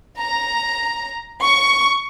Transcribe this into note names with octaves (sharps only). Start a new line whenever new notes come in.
A#5
C#6